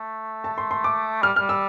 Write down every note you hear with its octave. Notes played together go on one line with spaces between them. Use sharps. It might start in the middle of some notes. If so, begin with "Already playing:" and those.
Already playing: A3
A5
C6
C6
D6
G3 F6
G3 F6
E6